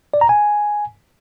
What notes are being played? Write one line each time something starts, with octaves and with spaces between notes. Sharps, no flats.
D5
A#5
G#5